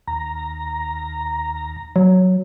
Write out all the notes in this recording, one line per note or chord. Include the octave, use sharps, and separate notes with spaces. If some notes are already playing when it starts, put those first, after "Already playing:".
D#2 A#5
F#3